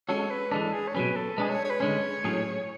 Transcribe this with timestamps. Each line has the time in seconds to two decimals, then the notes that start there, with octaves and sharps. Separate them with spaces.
0.08 G#3 C#4 F#4 A4 C#5
0.30 B4
0.52 E3 G#3 D4 A4
0.73 G#4
0.88 C#5
0.95 B2 F#3 C#4 B4
1.16 A4
1.38 G#3 D4 G#4 B4
1.49 C#5
1.65 C#5
1.70 B4
1.80 D3 G#3 C#4 C#5
2.24 A2 F#3 C#4 G#4